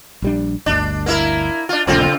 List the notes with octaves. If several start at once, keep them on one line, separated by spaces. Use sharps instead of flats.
A#1 G3 D4
G1 D2 D4
A#3 E4 A#4
D4 F4
E1 B1 A#2 C#3 C4 F4